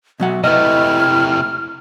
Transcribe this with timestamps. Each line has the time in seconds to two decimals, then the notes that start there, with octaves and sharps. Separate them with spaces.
0.20 B2 F#3 E5 F#5
0.44 C3 A3 E4 B4 D#5 F6